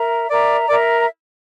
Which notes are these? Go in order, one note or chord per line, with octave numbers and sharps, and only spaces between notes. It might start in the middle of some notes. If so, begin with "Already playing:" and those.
Already playing: A#4 E5 A#5
A#4 D5 E5 A#5
A#4 D5 E5 A#5